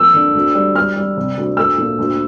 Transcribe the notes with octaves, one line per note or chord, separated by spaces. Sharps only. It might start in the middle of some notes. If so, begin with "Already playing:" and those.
Already playing: F2 A#3 E6
D3
D2
G3
G3 F6
G3
C3
D2
A3 E6
A#2
D2